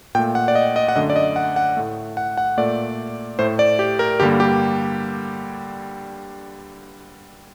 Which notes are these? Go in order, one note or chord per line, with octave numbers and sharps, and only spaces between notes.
A#2 A3 G5
F#5
D5
D#5
D#5
F#5
F#2 D3 A3 D#5
D5
D#5
F#5
F#5
A2 A3
F#5
F#5
A#2 A3 D5
A2 A3 C5
D5
G4
A#4
G2 D3 G3 A#3 G4
G4